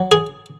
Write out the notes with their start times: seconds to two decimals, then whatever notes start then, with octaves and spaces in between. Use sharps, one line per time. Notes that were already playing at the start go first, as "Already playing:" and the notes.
Already playing: F#3
0.12 G#4